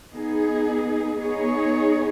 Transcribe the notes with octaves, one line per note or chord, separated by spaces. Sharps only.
B3 D#4 G#4
B3 D#4 G#4 C#5